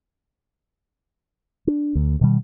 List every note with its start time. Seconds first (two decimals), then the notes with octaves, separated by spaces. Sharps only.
1.67 D4
1.95 D2
2.21 B2 D#3 G3